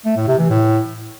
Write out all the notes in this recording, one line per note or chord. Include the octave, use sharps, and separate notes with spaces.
A3
A2
C3
E3
A2